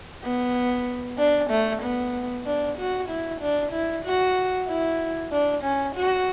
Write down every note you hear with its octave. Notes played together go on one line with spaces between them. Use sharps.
B3
D4
A3
B3
D4
F#4
E4
D4
E4
F#4
E4
D4
C#4
F#4